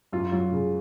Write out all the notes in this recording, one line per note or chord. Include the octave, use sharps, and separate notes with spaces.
F#2 F4
F#3 F4
C#3